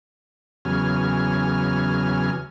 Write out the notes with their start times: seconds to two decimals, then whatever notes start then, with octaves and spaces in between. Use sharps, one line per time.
0.65 E2 C#3 F#3 G#5 F6